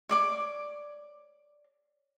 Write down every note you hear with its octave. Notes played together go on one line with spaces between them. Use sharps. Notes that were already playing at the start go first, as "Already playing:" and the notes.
C#5 D5 D6